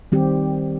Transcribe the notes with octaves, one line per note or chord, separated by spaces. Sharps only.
D#3 G3 C4 G4